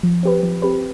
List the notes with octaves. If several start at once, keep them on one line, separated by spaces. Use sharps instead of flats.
F3
C4 G4 B4
F3
C4 G4 B4